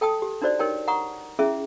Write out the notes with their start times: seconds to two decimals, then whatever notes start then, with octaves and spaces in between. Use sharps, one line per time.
0.01 A4 G5 A5 D#6
0.22 G4
0.42 D4 D#4 F#4 C5 D5
0.59 D#4 G4 A#4 C#5 G5 A5
0.88 F#5 A#5 C#6 D#6
1.39 C#4 E4 G#4 E5